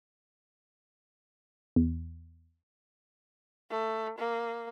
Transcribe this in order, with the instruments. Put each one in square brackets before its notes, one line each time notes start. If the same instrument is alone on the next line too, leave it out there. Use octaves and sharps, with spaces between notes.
[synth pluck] E2
[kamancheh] A3
A#3